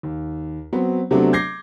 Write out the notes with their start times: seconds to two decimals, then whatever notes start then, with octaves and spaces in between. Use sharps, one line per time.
0.03 D#2
0.73 F#3 B3 C4
1.11 C3 F#3 A3 B3 C4 D4
1.33 D6 G6 G#6 A#6 C7